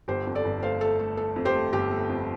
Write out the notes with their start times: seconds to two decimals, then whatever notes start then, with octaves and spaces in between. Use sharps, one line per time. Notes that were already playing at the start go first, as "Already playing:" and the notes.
0.08 G1 G4 C5
0.27 F2
0.35 A4 D5
0.45 G1
0.62 A3 C5 F5
0.81 A3 A4
0.99 A3
1.17 A3 A4
1.36 F2
1.45 G4 C5
1.54 A3
1.73 G1 G4
1.91 A3
2.09 F2